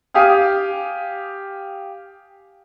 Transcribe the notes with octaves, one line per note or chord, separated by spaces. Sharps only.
G4 F5 G#5 D#6